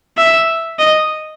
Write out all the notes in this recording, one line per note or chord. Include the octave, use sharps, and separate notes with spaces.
E5
D#5